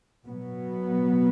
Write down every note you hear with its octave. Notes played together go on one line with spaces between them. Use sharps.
B2 F#3 B3